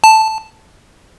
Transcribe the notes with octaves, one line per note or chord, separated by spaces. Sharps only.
A5